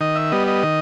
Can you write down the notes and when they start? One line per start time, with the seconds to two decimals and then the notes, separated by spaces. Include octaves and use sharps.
0.01 D#3 D#5
0.16 E5
0.32 G3 B3 D#5
0.48 D#5
0.63 D#3